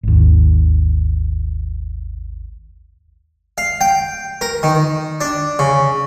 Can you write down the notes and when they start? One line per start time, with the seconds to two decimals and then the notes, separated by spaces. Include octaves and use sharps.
0.03 G#1 D#2
3.58 F5
3.81 G5
4.41 A#4
4.63 D#3
5.21 D4
5.59 C#3